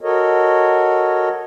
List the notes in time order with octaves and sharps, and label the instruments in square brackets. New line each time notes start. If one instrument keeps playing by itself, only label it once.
[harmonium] F#4 A4 A#4 C#5 D#5